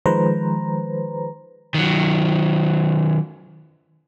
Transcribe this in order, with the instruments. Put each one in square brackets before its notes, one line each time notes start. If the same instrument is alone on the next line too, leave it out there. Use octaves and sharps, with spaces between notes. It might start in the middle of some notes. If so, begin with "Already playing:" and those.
[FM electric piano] D#3 F3 G#3 B4 C5 A#5
[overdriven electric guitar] D#3 F#3